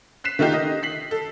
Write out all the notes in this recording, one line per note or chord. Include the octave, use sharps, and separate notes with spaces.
F#6 B6 C7 E7
D#3 A3 D#4 F4 G4 C7
D#5
B6 C7 F#7
A4